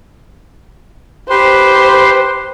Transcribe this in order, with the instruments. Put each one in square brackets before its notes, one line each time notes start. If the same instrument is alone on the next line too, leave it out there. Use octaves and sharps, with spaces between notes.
[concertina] G4 B4 C6 [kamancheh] C5